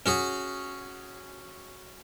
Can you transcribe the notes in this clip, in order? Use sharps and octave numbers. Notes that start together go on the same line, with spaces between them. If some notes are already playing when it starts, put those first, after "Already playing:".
C#4 F#4 G#4